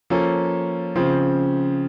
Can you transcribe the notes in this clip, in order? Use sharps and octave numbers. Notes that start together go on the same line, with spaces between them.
F3 A#3 C#4 A4
C#3 F3 C4